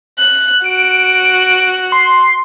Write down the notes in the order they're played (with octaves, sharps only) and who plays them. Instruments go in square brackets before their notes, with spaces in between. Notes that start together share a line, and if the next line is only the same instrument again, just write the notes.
[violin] F#6
[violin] F#4 [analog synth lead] D7
[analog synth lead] C6